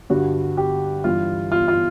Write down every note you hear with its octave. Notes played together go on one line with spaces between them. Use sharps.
G2 D3 G3 F#4
G4
G2 E3 G3 F4
F4
F4